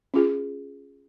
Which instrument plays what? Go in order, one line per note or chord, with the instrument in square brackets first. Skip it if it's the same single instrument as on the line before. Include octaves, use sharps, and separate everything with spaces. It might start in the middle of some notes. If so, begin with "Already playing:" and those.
[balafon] C#4 F4 G#4